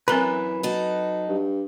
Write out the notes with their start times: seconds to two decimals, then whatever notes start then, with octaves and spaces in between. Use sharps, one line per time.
0.08 F#2 E3 C4 A#4 B4 A#5
0.63 F#3 D#4 A4
1.29 G2